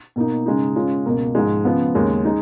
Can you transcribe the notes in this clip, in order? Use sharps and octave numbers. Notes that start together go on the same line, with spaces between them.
B2 A#3 D#4
C#3 G#3 D#4
C#3 G#3 C#4 F4
C#2 B2 A#3
G#2 F3 G#3
C#3 F3 B3 F4
D#2 C#3 G#3 C#4
G#3 D#4